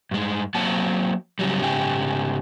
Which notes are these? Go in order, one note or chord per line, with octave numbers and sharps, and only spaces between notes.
G2 G#3
F#3 A#3 C4 F#5 A5
C#3 F#3 G3
G#2 C#3 G4 G#4